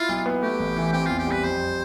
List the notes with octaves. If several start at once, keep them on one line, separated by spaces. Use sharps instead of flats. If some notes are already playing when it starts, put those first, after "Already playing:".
Already playing: E4 F4
B1
B3
A3 G4
A1
E3
C4 G4
E2 F4
G4
G3 B4
F2 C5